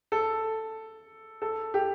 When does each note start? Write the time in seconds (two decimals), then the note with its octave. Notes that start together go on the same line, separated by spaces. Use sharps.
0.12 A4
1.42 A4
1.74 G4